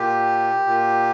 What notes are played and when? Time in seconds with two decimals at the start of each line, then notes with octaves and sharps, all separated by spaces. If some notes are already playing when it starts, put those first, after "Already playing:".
Already playing: A#2 G4
0.67 A#2